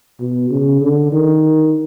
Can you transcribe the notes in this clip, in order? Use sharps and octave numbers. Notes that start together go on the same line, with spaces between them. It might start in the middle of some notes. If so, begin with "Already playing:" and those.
B2
C#3
D3
D#3